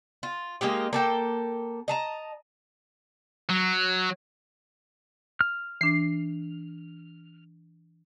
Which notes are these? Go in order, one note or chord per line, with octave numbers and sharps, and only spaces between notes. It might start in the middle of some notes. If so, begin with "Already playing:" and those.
F4
G#3 A#3 D#4 G4
A#3 A4 G5
D#5 A5 A#5
F#3
F6
E3 D4 C7